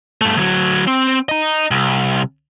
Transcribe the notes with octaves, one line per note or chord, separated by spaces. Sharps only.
G2 A3
D2 F#3
C4
D#5 A#5
C2